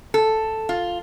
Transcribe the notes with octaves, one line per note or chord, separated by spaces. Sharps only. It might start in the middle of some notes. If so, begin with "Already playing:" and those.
A4
F4